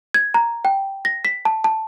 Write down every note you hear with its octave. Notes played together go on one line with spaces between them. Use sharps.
G#6
A#5
G5
A#6
B6
A5
A5